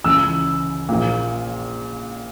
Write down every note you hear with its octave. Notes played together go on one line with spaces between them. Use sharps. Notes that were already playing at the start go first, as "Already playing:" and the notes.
C#2 C#3 E3 E6
A#1 A#2